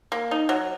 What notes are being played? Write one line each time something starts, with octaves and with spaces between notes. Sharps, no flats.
A#3
D#4
F#3